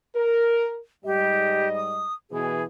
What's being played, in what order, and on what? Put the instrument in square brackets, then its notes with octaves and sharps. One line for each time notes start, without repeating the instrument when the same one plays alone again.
[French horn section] A#4
[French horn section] G#2 G3 D#5 [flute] G4
[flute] D#6
[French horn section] B2 E3 [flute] G#4